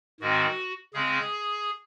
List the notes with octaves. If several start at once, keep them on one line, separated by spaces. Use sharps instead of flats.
G#2 D#3 G#3 C4 F#4
C#3 G#3 C4 G#4